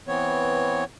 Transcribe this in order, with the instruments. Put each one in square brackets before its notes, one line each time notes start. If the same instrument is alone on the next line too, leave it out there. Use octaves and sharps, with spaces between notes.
[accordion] E3 B3 C4 C#5